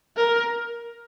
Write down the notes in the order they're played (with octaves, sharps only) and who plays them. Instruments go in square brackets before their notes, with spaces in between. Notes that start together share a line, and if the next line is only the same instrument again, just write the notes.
[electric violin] A#4